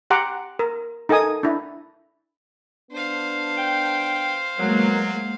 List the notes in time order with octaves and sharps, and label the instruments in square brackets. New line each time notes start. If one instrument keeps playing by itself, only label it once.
[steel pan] G4 F#5 A#5 C6 D6
A#4
D#4 A4 A#4 G#5 D#6
D4 E4
[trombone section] B3 D4 [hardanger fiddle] C5 F5
[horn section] G5
[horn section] F#3 [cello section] G#3 A#3 [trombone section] B3 A#4